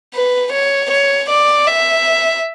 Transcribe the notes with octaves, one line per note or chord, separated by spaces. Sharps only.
B4
C#5
C#5
D5
E5